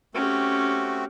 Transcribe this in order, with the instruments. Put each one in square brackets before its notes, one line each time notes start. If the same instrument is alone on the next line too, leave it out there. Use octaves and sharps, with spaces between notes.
[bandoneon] A3 C4 F#4 [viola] C#4 G4